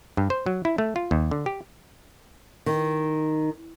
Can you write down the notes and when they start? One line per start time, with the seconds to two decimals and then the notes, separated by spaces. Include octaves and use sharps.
0.17 G2
0.30 C5
0.46 F#3
0.65 E4
0.78 A3
0.96 F4
1.11 D#2
1.31 D3
1.46 G4
2.66 D#3